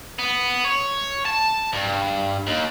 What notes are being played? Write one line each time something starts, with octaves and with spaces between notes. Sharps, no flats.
B3
C#5
A5
G2
D#2